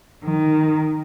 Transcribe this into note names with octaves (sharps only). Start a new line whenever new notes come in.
D#3